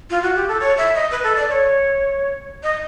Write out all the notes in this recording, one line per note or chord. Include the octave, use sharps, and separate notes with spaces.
F4
F#4
G4
A4
C#5
E5
D#5
B4
A4
D5
C#5
D#5